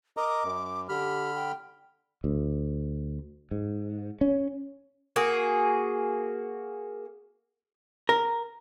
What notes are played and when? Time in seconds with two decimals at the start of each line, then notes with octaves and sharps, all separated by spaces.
0.17 A#4 D#5 A#5 D6
0.44 F#2
0.89 D3 G4 B5 F6
1.35 G5
2.24 D2
3.51 G#2
4.21 C#4
5.16 A#3 F#4 G#4
8.09 A#4